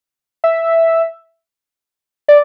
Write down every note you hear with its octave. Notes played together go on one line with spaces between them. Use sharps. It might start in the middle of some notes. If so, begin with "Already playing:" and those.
E5
D5